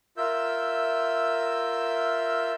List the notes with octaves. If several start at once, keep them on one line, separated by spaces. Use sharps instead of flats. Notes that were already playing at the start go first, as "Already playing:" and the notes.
F4 A#4 E5 E6 G6